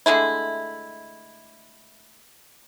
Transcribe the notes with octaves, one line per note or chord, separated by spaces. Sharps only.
D3 G#3 A3 E4